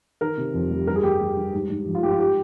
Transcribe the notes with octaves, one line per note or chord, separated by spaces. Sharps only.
D#3 A#4
C3
F2
G3
G2 A#4
G#4
G3 G4
G3
G2
G#2
G#2
F3
F4
G#2 G4
F4
G4